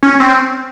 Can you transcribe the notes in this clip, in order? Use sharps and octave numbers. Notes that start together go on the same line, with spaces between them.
C#4
C4